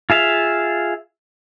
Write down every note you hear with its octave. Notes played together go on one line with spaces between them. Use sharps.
F4 G#4 E5 F5